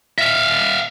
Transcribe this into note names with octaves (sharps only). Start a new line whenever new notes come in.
E5 F5